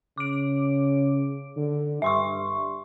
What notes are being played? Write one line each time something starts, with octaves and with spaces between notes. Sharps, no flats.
C#3 D6 D7
D3
G2 E5 C6 C#6